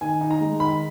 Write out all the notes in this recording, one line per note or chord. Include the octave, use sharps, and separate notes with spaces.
D#3 G#5
D#4
A#5
G#3
D#3 B5